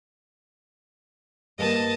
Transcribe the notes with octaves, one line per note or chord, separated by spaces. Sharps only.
G2 A#3 D#5 A5 D#7